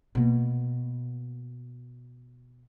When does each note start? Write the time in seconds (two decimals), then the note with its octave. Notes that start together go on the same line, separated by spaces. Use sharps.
0.15 B2 A#3